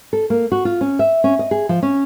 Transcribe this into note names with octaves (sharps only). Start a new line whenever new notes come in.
A4
A#3
F#4
F4
C#4
E5
C#4
D#5
G#4
F3
C#4